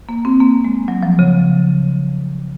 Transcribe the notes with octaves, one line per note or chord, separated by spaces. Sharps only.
A#3
C4
A#3
G#3
F#3
F3
C#3